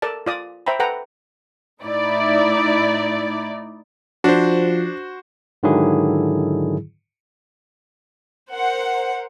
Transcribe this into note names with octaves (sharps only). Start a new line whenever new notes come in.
A4 A#4 D5 A5
F4 D5 D#6
C5 E5 G5 A#5 B5
A4 B4 F#5 G5 A#5
A2 D#4 E4 D5
F3 D4 F#4 C5
G#2 D3 D#3 F#3 E4 G#4
A#4 C5 F#5